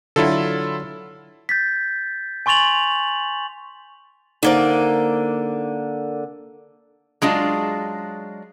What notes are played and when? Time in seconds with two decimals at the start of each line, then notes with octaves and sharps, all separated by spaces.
0.16 D3 F#3 E4 F4 A4
1.49 G6 A6 B6
2.46 G#5 C6 C#6 A6 F7 F#7
4.43 D3 A#3 D#4 C5 D5
7.22 F#3 G#3 D4 F4